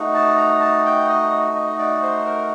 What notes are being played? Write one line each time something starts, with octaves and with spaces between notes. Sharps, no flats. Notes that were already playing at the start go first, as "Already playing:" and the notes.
Already playing: A3 D#4 F#4
A5
A#5
A5
G5
D#5
D#5
D5
C5
A#4